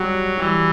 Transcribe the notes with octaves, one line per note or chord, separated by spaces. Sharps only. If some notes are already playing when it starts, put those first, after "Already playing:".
Already playing: F#3 G3 F#4
E3 G3